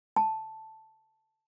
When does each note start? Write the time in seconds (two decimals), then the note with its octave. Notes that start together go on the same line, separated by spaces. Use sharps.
0.16 A5